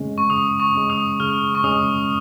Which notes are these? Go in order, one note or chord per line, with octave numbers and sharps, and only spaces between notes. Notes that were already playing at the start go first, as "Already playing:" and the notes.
Already playing: C#3 G#3 C#4
C#6
C#3 D#6
C#6
G#3 C#4
D#6
C#3 F6
C#6
G#3 C#4 D#6